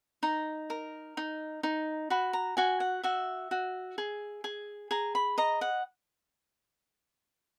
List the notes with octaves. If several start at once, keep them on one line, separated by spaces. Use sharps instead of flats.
D#4 A#5
A#4
D#4
D#4
F#4 B5
A#5
F#4 G#5
F#5
F#4 E5
F#4
G#4
G#4
G#4 A#5
B5
D#5 A#5
F#5